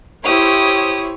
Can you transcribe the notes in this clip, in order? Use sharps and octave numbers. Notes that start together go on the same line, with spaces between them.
E4 G4 C5 C#5 D#6